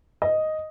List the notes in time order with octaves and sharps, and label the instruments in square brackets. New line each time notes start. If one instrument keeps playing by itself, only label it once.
[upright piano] D#5